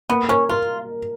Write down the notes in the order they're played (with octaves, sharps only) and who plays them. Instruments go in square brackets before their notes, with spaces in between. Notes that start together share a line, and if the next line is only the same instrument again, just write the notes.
[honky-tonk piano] A#3 [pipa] B3
[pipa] C#4 [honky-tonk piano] A#4
[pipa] F4 [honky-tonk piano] A#4